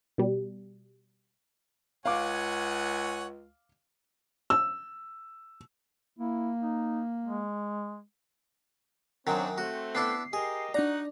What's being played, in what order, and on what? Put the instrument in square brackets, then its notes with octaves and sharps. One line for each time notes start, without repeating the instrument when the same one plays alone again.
[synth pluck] B2 G3
[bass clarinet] C#2 [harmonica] C#5 F#5 G#5 [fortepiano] F5 D6
[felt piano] E6
[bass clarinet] A#3 [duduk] E4
[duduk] D#4
G#3
[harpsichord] F#2 D#3 F#3 [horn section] C4 D4 C#5
[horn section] A3 C4 [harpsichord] F#4
[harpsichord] B3 D4 E4 [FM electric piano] C7
[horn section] G4 A#4 D#5 [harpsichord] G#4
[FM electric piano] D4 D5 [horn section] D#4 F#4 F#5 [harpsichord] A#5